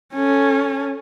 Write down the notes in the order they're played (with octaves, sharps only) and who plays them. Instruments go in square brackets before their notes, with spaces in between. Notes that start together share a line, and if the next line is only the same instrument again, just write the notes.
[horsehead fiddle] C#4 A4